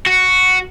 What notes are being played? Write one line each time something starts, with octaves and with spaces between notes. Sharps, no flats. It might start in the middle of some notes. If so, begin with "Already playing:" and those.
F#4